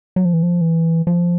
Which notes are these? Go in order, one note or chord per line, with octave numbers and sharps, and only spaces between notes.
F#3
F3
E3
F3
E3
F3